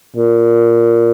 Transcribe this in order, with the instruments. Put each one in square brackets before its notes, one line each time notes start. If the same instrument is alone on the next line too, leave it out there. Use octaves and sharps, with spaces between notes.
[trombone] A#2